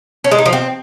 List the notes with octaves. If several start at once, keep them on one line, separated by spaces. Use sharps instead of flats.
C#4
G#3
D#4
F3
C4